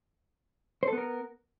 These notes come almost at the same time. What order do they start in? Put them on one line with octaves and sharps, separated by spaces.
C5 A4 B3 A#4